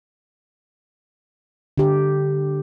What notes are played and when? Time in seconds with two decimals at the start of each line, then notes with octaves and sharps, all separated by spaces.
1.78 D3 G4